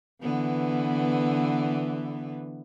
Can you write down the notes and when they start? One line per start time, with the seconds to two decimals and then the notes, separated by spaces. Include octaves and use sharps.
0.22 D3 E3 B3